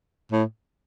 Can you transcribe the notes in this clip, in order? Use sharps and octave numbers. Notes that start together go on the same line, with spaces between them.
A2